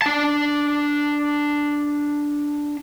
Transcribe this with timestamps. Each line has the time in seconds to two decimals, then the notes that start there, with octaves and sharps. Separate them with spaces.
0.02 D4 A5